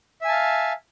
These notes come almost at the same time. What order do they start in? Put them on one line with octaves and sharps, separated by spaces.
E5 G#5 A5 F5